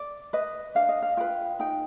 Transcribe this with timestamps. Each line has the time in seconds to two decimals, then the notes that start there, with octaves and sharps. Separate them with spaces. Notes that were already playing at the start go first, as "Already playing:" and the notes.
Already playing: D5
0.33 B4 D#5
0.75 D4 F5
0.89 D#5
1.02 F5
1.17 F4 B4 G5
1.60 D#4 G5